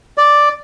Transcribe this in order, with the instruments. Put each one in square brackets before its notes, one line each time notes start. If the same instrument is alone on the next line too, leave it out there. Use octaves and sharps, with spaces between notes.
[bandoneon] D5